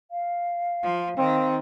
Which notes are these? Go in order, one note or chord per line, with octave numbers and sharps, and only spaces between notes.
F5
F3
D#3 C4